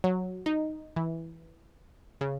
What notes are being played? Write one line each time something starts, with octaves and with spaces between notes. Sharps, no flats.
F#3
D#4
E3
C#3